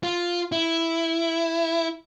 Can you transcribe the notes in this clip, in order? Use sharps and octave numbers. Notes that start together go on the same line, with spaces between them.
F4
E4